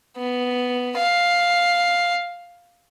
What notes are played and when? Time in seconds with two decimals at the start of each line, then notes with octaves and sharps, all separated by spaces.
0.17 B3
0.97 F5